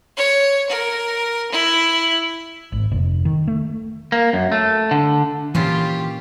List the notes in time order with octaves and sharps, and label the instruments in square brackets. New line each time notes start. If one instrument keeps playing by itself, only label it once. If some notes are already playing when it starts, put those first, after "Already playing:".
[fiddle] C#5
A#4
E4
[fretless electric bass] G#1
F1
D#3
A3
[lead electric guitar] A#3
F#2
A3
D3
[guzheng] A#2 C#4 [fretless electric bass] E3 [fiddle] F4 G4